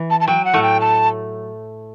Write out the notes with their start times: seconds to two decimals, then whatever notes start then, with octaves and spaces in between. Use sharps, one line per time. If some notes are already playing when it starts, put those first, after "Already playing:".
Already playing: E3
0.10 A5
0.20 A5
0.28 F#3 G5
0.45 F#5
0.53 A2 A3
0.62 G5
0.80 A5